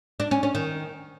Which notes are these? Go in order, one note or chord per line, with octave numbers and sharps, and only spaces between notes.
D4
C#4
C#4
D#3